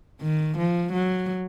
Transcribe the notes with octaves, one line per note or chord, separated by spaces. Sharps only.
D#3
F3
F#3